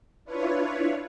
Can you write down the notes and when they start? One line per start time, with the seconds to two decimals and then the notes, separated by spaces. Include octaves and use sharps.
0.25 D4 E4 F4 B4 C#5